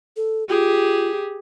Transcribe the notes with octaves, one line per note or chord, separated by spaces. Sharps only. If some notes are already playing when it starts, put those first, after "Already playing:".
A4
F4 G4 G#4